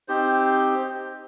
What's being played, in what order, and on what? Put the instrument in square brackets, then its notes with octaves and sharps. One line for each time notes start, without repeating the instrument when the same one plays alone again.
[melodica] C4 D#4 G4 C5